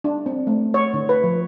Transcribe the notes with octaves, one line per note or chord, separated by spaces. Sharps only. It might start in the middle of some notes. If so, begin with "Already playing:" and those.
D4
C4
A3
C#5
D3
B4
F3